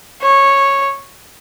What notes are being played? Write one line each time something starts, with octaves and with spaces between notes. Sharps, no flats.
C#5